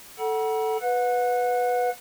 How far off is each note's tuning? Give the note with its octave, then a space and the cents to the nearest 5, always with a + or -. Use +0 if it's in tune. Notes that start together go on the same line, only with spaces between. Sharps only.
A4 +0 F#5 +15 B5 -45
B4 +0 F#5 -35